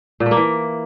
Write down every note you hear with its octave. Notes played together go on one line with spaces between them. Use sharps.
A#2
A3
A#3
E3